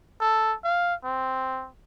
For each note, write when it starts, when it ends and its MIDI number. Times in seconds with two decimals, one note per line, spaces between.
0.20 0.55 69
0.64 0.94 77
1.04 1.68 60